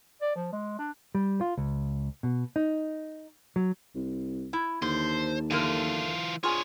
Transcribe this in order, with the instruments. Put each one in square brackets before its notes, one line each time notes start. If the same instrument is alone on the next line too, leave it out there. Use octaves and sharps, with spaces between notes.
[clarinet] D5
F3
G#3
D4
[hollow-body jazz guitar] G3
F4
C#2
B2
D#4
F#3
[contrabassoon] C2
[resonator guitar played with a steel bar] E4
[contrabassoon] D#2 [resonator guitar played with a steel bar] D3 [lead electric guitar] C5
[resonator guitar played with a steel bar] D3 A3 A#4 [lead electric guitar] E3 F4
[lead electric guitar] D4 C#5 [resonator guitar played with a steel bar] F4 G#4 G#5